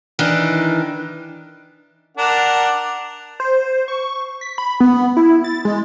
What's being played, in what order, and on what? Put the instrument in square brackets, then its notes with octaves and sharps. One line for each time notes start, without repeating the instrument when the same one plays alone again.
[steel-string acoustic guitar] D#3 E3 D4
[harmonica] D4 A#4 F#5
[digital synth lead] C5
C#6
B6
B5
B3
E4
A6
G#3